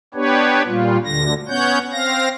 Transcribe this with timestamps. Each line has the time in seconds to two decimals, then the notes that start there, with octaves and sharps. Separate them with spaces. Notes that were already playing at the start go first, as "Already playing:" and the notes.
0.14 B3 D4 G4 B4 C#5
0.67 A#2 G3 F4
1.05 D2 D3 A#6
1.49 B3 C#4 C#5 F#5 G6
1.92 C4 F5 A#6